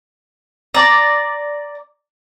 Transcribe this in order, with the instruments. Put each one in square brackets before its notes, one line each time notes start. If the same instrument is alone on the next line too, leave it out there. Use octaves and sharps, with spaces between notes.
[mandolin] D5 A#5